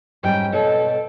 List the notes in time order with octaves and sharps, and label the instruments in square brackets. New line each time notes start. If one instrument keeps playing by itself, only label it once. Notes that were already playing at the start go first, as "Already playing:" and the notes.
[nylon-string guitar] G#2 G3 C#4 [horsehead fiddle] G5
[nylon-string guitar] B2 B4 C#5 [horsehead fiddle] A4